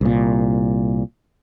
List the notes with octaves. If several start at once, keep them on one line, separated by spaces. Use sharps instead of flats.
C2 A#2